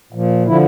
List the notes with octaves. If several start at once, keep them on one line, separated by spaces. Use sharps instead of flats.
A#2 F3
D3 F3 E4